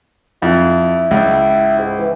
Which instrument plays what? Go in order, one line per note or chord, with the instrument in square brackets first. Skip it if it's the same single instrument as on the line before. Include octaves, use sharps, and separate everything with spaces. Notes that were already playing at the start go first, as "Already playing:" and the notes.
[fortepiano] F2 [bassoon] E4
[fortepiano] C#2
[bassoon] G#2
E3